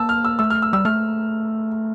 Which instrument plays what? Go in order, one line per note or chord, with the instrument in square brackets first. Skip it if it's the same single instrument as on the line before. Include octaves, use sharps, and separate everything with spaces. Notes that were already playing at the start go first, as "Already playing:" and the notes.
Already playing: [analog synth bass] A#3 [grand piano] A5 E6
[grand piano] F6
E6
[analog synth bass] A3 [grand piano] E6
[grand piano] F6
E6
[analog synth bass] G3 [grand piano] E6
[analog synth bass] A3 [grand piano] F6